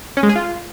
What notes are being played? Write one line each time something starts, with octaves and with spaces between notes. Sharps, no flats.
C#4
G#3
G#4
F4